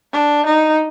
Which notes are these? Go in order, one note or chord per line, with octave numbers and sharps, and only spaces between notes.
D4
D#4